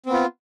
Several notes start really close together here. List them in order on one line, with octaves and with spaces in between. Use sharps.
C4 B3 F4